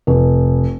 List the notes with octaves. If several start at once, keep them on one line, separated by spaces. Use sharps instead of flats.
F1